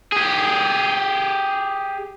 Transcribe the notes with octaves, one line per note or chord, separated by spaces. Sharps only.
G4 G#4